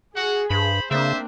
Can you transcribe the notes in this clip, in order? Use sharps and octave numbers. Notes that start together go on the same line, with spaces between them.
F#4 G#4 F#5
G2 C5 B5
C#3 A#3 C4 D4 C5 E5